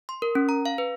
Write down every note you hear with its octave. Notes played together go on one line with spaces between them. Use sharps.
C6
A#4
C#4
A#5
F5
B4